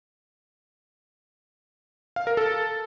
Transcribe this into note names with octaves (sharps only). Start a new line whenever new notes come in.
F5
A#4
A4